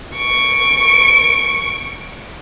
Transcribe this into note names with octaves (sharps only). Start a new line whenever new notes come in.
C#6 D7